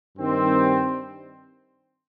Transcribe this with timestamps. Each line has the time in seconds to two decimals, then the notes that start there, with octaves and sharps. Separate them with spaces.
0.17 G2 D#3 G3 C4